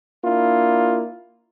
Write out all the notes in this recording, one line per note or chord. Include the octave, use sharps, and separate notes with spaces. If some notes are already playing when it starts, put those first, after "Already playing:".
A#3 D4 E4 F4